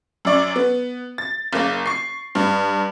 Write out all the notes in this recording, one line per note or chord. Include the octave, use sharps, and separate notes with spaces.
F#2 D5 C#6
B3
A6
F#1 A#3
C#6 C7
G2